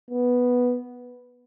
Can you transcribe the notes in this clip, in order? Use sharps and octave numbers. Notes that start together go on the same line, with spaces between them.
B3